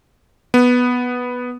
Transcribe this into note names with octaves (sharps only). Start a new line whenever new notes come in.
B3